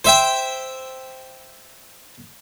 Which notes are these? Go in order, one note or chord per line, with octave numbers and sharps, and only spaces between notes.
C5 E5 G5